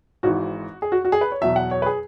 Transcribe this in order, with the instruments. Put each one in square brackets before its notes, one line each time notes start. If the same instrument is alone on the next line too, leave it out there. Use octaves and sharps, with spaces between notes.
[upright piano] G#1 G#2 E3 F#4
G#4
F#4
F#4
G#4
B4
C#5
E2 B2 F#3 E5
F#5
C#5
B4
G#4